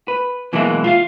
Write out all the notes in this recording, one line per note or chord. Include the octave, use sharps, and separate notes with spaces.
B4
B2 E3 F#3 G#3 A#3 E4
F4 E5 F5